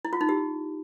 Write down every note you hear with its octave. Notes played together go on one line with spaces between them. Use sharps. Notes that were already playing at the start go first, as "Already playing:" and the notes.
E4
F4
D#4
G4